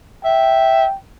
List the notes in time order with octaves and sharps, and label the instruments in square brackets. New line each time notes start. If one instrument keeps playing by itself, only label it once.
[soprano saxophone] E5 [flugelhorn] G5